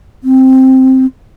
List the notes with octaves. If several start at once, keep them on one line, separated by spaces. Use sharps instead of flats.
C4